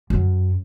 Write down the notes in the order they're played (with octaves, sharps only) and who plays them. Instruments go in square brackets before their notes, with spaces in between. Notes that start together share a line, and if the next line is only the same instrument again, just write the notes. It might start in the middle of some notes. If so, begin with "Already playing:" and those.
[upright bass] F#2